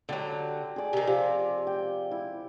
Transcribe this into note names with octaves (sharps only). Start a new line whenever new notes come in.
D3 F#3 G4 A4
G#4 D5
C3 D#3
C3 F3
G5
E4